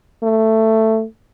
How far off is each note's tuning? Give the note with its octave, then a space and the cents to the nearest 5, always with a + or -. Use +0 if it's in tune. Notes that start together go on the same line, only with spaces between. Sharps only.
A3 +10